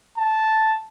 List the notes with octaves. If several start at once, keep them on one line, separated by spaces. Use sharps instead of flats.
A5